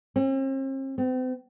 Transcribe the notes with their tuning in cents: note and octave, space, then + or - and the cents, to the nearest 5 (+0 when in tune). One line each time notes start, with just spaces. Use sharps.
C4 +45
C4 -40